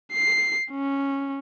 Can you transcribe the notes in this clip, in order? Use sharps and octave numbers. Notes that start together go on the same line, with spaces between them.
C7
C#4